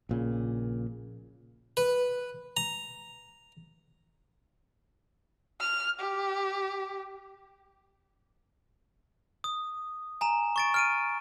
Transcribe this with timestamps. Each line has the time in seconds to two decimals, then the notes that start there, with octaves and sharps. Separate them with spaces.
0.09 A#1 A#2 C#3
1.77 B4
2.57 A#5
5.60 F6
6.00 G4
9.44 D#6
10.21 G#5 A#5 E7
10.56 C#6 A6 D7
10.74 F6 D7 D#7